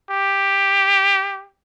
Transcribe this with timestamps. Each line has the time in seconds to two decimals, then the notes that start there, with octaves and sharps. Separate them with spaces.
0.11 G4